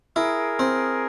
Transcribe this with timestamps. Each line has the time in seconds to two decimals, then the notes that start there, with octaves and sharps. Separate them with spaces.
0.16 E4 G#4 A#4
0.59 C4